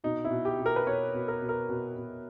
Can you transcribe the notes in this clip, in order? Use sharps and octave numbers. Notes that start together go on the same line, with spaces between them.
B2 D#4
E4
B2
G4
B2
A#4
B4
B2 C#5
B2
A#4
B2
A#4
B2
B2